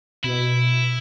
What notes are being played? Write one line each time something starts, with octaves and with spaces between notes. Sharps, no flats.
B2 E4